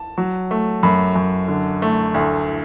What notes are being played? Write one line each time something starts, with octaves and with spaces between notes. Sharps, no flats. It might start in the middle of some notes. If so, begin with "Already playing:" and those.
Already playing: A5
F#3
A3
F#2 B5
F#2
D3
A3
D2